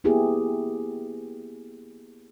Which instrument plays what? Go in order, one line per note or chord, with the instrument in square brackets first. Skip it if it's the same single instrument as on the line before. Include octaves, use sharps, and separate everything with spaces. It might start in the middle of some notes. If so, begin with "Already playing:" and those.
[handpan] A#3 B3 E4 G4 G#4